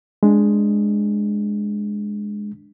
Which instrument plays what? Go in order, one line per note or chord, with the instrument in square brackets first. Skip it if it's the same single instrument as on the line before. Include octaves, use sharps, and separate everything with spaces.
[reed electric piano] G#3 D4